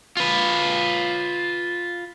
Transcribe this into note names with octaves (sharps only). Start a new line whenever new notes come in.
F4 B4